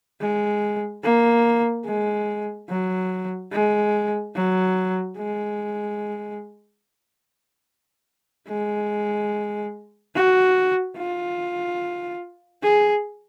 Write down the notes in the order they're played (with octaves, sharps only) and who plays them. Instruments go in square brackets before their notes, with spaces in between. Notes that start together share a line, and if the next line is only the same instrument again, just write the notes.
[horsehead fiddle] G#3
A#3
G#3
F#3
G#3
F#3
G#3
G#3
F#4
F4
G#4